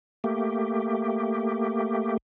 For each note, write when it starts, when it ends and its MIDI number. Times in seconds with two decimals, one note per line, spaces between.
0.24 2.17 57
0.24 2.17 58
0.24 2.17 67